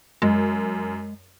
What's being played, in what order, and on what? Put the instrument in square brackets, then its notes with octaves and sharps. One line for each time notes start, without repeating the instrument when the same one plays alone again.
[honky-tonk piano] F#2 [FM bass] G#3